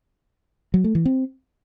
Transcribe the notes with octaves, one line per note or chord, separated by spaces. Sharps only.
F#3
A3
E3
C4